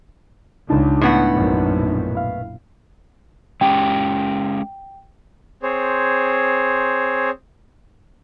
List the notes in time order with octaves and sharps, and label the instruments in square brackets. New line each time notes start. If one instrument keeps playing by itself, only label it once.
[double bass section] C#2 [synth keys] D4 D#4 A5
[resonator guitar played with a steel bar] A2 B3 F#5
[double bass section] A#1 F#2 B2
[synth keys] E4 F5
[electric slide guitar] G#3 C#4 G4 [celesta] G5
[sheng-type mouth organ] C4 G#4 C5 C#5